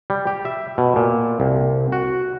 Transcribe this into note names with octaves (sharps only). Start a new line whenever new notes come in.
G3
G4
E5
B2
A#2
C2
F#4